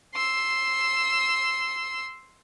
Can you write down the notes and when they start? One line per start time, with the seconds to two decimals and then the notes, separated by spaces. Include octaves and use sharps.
0.15 C6 E6